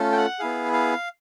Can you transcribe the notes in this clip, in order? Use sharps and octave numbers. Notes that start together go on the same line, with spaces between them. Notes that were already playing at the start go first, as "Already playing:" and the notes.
Already playing: A3 C#4 F4 A4
G5
F#5
B3 E4 G#4 F5
F5